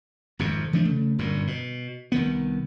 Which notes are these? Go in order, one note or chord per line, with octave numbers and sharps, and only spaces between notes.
G#1 F2 C3
E3 F3 A3 D4
C#3 A3
G1 F#2 A#2
B2
C2 D#3 B3